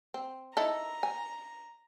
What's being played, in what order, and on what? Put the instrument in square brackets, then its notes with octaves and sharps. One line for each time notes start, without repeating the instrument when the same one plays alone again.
[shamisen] C4
[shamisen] D#4 E4 A4 [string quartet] A#5
[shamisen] G#5